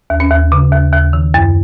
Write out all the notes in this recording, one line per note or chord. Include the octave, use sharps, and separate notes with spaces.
D#2
C#4
D#2
C#3
D#2
D#2
D#3
F#2